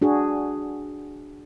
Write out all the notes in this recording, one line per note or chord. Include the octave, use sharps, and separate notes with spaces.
D4 F#4 G#4